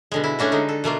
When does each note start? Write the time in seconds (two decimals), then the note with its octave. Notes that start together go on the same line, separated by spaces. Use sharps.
0.12 B2 D3 G#3
0.24 E4
0.39 A3 C#4 D4 F#4
0.52 D3 G#3 D#4
0.69 A4
0.84 B2 A3 A#3 F4